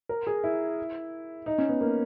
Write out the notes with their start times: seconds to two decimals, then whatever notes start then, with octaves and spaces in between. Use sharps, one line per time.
0.09 A#4
0.27 G#4
0.44 E4
1.46 D#4
1.58 C#4
1.69 B3
1.81 A#3